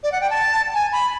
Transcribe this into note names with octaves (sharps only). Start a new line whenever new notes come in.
D5
F#5
G5
A5
G#5
B5